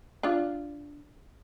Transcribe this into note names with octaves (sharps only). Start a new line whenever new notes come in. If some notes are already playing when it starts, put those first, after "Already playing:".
D4 F4